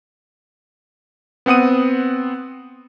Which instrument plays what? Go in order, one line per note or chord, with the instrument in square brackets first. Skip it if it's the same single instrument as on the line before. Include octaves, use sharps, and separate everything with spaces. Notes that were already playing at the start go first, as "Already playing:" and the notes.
[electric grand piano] B3 C4 F#5 D#6 D#7